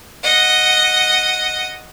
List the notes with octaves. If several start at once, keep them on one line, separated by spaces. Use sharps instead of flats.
D#5 F#5